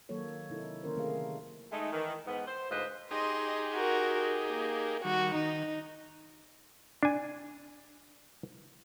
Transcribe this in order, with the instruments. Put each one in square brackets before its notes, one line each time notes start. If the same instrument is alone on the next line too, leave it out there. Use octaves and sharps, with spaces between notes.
[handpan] D#3 F#3 A#3 A4 C#5
C3 D#4 E4 A4
D3 D#3 A#3 C#4 A#4 C5
C3 A3 G#4 F5
[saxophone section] G#3 A3 D#4
D#3 E3
G#2 B3
C5
D2 G#2 F4 B4 C5 D#5
[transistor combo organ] D#4 G4 G#4 [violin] D#5 C6
[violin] F#4 A#4
A#3
[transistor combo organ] D#3 G3 [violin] F#4
[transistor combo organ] D#3 [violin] D#4
[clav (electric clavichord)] D4 G#5